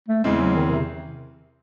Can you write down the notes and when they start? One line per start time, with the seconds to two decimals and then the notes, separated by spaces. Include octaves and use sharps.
0.08 A3
0.24 E2 C#3 E3 G#3 C4
0.40 F#3
0.55 D#3
0.71 C3